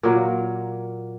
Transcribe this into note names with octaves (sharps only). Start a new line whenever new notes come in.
A#2 F#3 A#3